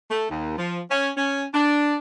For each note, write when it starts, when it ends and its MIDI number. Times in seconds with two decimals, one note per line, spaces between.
0.11 0.29 57
0.30 0.56 39
0.58 0.81 53
0.90 1.11 61
1.17 1.45 61
1.54 1.97 62